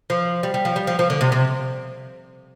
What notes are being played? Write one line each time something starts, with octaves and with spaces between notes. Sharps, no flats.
F3
G3
G3
F3
G3
F3
F3
D3
C3
C3